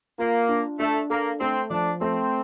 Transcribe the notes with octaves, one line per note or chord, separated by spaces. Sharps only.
A#3 F4
D4
A3 D4
A#3 A4
A3 C4
F3 D4
A3 C4